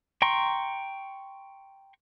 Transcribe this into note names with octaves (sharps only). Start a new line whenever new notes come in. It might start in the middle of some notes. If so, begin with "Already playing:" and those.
G5 A#5 C6 C#6